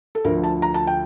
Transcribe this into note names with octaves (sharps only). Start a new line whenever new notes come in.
A4
D2 D3 F3 A#4
A5
A#5
A5
G5